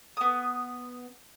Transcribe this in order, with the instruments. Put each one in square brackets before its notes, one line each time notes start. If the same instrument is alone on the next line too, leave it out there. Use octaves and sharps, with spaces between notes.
[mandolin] B3 D#6